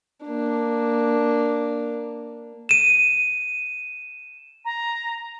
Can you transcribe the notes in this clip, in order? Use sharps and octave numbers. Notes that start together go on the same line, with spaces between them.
A#3 D4
D#7 E7
A#5